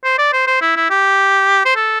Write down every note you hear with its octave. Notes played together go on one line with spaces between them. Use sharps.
C5
D5
C5
C5
E4
E4
G4
C5
A4